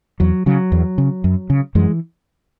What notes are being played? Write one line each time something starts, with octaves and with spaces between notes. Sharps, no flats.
E2 F#3
C#3 F#3
E2
C#3
F#2
C#3
F#2 E3 G#3